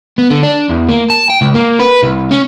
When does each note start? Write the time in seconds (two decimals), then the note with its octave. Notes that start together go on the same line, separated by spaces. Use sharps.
0.18 B3
0.31 D3
0.43 D4
0.70 E2
0.89 A#3
1.10 A5
1.30 G5
1.42 C#2
1.55 A#3
1.80 B4
2.03 C2
2.31 C#4